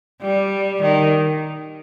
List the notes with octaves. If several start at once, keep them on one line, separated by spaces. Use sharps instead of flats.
G3
D#3